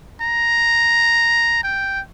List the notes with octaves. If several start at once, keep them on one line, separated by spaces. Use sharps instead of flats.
A#5
G5